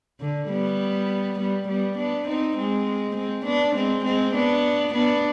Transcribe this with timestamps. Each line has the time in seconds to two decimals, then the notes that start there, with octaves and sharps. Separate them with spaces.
0.21 D3
0.50 G3 B3
1.39 G3 B3
1.68 G3 B3
1.98 B3 D4
2.28 C4 D#4
2.57 G#3 C4
3.16 G#3 C4
3.45 B3 D4
3.75 G#3 C4
4.05 G#3 C4
4.34 B3 D4
4.94 B3 D4